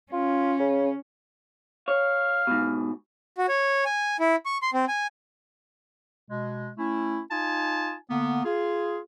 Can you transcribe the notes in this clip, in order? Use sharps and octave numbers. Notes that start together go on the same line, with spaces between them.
C#4 F4
C#3
C#5 F5
G#2 B2
F#4
C#5
G#5
E4
C#6
C6
C4
G#5
B2 G#3
A3 C#4 E4
D#4 F4 G#5 A5
D3 A#3 B3
F4 G#4